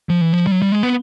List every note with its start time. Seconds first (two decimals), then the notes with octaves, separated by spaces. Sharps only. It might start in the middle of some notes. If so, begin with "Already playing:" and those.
0.09 F3
0.21 E3
0.33 F3
0.47 G3
0.52 F#3
0.62 G3
0.72 G#3
0.83 B3